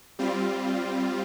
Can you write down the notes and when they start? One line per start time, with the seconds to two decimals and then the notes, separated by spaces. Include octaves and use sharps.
0.19 G3 C4 F4